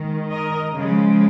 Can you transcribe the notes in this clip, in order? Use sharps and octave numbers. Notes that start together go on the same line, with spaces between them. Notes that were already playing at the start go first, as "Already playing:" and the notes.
Already playing: D#3 G#3
A#4 D#5
C#3 F3 G#3